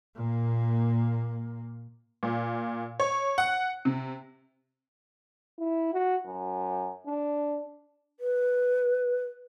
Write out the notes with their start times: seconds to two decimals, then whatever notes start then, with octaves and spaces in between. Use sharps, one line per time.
0.16 A#2 A#3
2.23 A#2
3.00 C#5
3.38 F#5
3.85 C3
5.59 E4
5.93 F#4
6.26 F#2
7.07 D4
8.20 B4